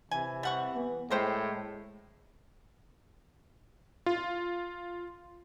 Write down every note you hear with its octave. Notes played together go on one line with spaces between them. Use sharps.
C3 E3 G#5
G3 F#5 C#6
B3
A2 G#3 A#4 C5 G5
F4